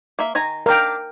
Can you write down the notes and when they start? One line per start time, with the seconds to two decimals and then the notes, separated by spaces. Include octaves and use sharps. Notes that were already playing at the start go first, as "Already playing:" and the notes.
0.19 A#3 E5
0.35 D#3 G#5 A#5
0.66 D4 A#4 F5 G5